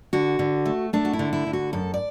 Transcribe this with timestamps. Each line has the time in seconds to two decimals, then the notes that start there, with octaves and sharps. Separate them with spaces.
0.13 D3 F#4
0.39 D3
0.66 A3
0.93 A3 D4
1.05 F#4
1.13 E4
1.19 D3
1.33 E4
1.47 D3
1.53 F#4
1.73 F#2 A4
1.94 D5